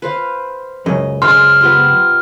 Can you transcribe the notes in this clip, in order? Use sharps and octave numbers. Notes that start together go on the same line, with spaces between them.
B4 C5 F5
C#2 F#2 C#3 D#5
G#3 C5 F5 C6 F6
B3 F4 G4